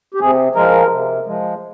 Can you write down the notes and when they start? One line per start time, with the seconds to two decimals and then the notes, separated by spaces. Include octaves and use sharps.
0.14 G4
0.20 C3 G#4
0.55 F3 G#3 A#4
0.91 C3
1.26 F3 G#3